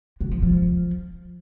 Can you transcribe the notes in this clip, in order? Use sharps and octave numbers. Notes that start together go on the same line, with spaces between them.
D3
F3
F3